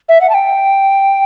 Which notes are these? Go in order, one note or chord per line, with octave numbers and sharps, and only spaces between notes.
E5
F#5
A5
G5